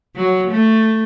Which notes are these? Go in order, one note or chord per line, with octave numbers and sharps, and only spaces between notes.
F#3
A3